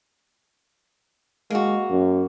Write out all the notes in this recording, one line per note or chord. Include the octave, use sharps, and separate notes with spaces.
G#3 A#3 F#4
F#2